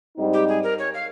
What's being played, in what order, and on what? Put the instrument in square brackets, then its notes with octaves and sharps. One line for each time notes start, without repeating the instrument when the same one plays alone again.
[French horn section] G#2 G3 C4 D#4
[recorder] G4
G#4
A#4
C#5
F5